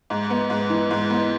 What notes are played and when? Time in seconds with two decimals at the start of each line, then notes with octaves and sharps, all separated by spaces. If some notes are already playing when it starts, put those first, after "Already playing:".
0.10 G#2
0.30 B3
0.50 G#2
0.70 E3
0.91 G#2
1.10 B3